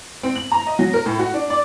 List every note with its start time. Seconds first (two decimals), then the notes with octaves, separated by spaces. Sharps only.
0.23 C4
0.36 F#7
0.52 A#5
0.67 D#5
0.79 F#3
0.93 A#4
1.06 A2
1.19 F#4
1.34 D4
1.50 D5